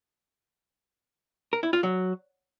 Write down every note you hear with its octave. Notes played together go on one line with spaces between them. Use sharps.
A#4
E4
F4
F#3